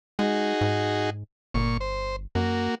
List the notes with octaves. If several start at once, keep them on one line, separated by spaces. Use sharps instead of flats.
G#3 D#4 F#4 G#4
G#2
G1 A#2 C#6
C5
F#2 A#3 F#4